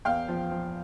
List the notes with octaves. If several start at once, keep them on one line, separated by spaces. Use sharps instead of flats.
E2 F5 G5
F3
F3